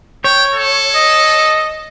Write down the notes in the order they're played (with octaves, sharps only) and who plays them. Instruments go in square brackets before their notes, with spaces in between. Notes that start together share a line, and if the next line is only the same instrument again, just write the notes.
[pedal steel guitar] C#5 [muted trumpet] G5
[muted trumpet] A4
[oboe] D#5